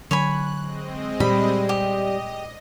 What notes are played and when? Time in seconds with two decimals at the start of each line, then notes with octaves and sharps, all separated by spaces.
0.11 D3 F#3 C#5 G#5 B5 F#6
0.62 G#3 C4 D#5
1.20 A#2 G3 B5
1.69 G4 D#5